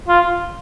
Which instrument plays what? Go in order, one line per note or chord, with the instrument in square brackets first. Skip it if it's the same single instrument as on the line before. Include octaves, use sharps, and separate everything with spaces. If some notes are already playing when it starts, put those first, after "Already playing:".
[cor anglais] F4